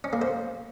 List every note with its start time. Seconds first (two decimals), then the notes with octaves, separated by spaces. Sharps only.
0.04 C#4
0.13 A#3
0.22 C5